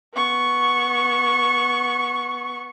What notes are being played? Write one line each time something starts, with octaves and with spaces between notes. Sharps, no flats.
B3 C#6